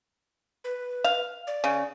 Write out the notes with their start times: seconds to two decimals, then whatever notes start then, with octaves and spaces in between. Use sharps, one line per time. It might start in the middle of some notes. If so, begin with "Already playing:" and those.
0.64 B4
1.04 F5
1.47 D5
1.64 C#3